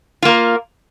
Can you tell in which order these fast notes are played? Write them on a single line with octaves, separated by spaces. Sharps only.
F4 A#3 A#4